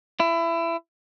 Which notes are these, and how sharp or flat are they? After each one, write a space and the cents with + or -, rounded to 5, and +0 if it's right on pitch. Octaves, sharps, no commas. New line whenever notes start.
E4 +25